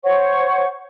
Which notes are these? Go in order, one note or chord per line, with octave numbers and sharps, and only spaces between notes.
C5 C#5 F#5 C#6